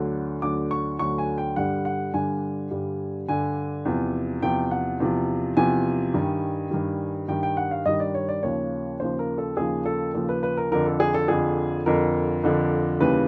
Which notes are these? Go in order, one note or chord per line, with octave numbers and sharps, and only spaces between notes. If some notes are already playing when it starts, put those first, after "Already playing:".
Already playing: D2 D3 F#3
D2 D3 F#3 D6
C#6
D2 D3 F#3 C#6
G#5
G5
G2 D3 G3 F#5
F#5
G2 D3 G3 G#5
G2 D3 G3
G2 D3 G3 G#5
E2 C3 F3
E2 C3 F3 G5
F#5
E2 C3 F3
E2 C3 F3 G#5
G2 D#3 G3
G2 D#3 G3
G2 D#3 G3 G5
G5
F#5
F5
G2 D#3 G3 D#5
D5
C#5
D5
D#2 C#3 F3 C#5
D#2 C#3 F3 C5
A#4
A4
D#2 C#3 F3 G#4
A4
D#2 C#3 F3 A4
B4
B4
A#4
F2 D3 F3 A#4
A4
G#4
A4
F2 D3 F3 G#4
F2 D3 F3 A#4
F2 D3 F3
D#2 C#3 E3 G3 B4